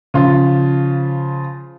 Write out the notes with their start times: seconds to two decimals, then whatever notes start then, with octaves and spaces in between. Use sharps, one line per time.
0.14 C#3 F3 F4